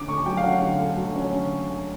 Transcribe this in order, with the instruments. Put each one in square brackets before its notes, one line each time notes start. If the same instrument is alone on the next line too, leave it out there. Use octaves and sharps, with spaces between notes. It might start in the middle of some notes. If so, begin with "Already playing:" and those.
Already playing: [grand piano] D3 C#4 D6
A3 C#6
F#3 G5
F5
C#4 F#5
D3
A3
F#3
C#4
D3